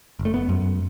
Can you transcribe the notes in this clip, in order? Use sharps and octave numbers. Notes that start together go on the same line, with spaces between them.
F#1
A3
B3
F#2